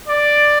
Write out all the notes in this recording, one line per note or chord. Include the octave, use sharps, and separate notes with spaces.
D5